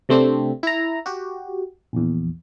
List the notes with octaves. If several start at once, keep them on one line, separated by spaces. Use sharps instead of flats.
C3 A3 C4 D4
E4 A#5
F#4 G4
A#1 E2